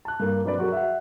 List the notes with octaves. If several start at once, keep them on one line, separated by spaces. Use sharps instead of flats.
A5 F#6
G2 A#3
F#3 C4 D4 B4 D5
F#3 F#4 G#4 A#4
E5 F#5